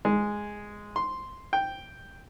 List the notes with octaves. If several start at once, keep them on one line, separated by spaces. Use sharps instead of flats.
G#3
C6
G5